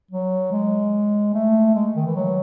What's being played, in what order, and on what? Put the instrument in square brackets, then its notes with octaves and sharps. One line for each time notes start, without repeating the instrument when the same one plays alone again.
[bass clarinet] F#3
G#3
A3
G#3
D#3
E3
F#3